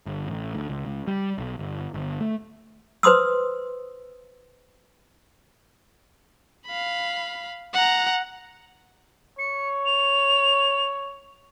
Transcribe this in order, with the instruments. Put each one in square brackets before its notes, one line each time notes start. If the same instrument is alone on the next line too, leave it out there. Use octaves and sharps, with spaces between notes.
[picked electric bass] G1
A1
D2
C#2
C#2
G3
B1
G1
G1
A3
[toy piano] B4 C5 C6 D#6 E6
[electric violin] F5 B5
F#5 A#5
[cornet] C#5 [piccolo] C#7
[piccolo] F7